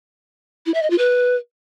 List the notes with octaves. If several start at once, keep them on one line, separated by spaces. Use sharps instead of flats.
E4
E5
D#5
F4
B4